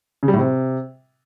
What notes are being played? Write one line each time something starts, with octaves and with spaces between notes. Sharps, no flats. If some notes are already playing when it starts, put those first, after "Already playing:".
C#3
G3
A2
C3